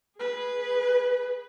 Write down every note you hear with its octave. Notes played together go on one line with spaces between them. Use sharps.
G#4 B4